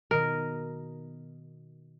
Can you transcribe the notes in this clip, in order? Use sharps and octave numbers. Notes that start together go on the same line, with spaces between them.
B2 D#3 A#4 D#5